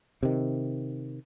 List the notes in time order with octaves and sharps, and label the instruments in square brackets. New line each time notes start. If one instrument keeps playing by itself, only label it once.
[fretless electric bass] C3 D#3